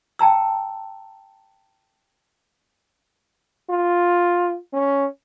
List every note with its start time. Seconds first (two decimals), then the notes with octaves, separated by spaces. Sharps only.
0.19 G5 A5 A#5 E6
3.70 F4
4.73 C#4